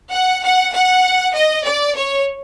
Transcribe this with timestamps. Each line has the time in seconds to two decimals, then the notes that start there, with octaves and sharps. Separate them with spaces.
0.12 F#5
0.43 F#5
0.73 F#5
1.35 D#5
1.65 D5
1.95 C#5